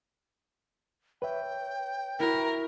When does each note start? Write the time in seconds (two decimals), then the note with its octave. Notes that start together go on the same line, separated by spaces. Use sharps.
1.22 B4 C#5 E5 G5
2.20 E4 F#4 A#4